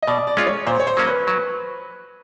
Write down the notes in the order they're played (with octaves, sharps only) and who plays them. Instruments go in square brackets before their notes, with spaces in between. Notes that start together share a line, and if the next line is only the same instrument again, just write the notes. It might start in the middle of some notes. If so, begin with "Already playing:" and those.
[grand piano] D#5
[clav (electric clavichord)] B2 [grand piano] D5
[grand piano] D5
[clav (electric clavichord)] G#3 C#4 F4
[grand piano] C#5
[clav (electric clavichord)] A#2 [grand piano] C5
[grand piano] C#5
C5
[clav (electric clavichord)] F#3 A#3 C#4
[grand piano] B4
[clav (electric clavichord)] F#3